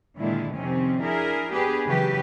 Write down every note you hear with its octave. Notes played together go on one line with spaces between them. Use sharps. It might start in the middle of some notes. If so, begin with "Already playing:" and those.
A#2 D3 D#3 G#3 E4
F2 C3 D#3 C4 C#4
D4 E4 G#4 A#4
B3 D4 G4 G#4 B4
C#3 E3 F#3 G4 B4